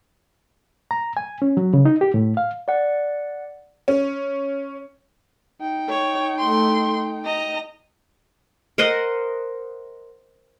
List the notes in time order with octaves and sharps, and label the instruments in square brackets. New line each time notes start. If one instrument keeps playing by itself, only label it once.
[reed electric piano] A#5
G#5
C#4
F#3
C#3
D#4
G4
A2
F5
[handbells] D5 F#5
[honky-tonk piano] C#4
[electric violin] D#4 G5
[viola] C#5
A3 C6
D#5 A#5
[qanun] A#4 C5 D#5 F#5